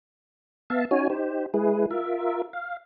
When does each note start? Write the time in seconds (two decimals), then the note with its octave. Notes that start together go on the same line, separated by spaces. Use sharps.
0.70 B3 E5 F5 A5
0.91 C#4 D#4 F#4 C#5 G#5
1.10 D#4 G4 C5
1.54 G#3 E4 G#4 B4
1.91 F4 A#4 E5
2.53 F5